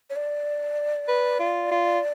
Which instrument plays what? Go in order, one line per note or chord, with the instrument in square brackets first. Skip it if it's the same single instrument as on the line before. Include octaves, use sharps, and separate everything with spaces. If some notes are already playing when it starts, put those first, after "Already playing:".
[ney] C#5
D5
[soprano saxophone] B4
F4
F4